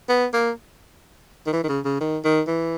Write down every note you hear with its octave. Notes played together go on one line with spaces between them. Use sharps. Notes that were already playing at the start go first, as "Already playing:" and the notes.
B3
A#3
D#3
E3
D#3
C#3
C#3
D#3
D#3
E3